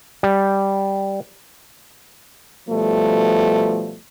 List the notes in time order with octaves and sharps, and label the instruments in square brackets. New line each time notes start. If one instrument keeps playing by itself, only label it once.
[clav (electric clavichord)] G3
[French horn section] B2 F3 G3 A3